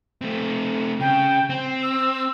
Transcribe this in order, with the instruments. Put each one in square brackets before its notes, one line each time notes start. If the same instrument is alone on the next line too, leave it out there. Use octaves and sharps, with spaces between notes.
[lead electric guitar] A3 C4
[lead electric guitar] C#3 [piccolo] G5
[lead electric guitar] C4
[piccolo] E6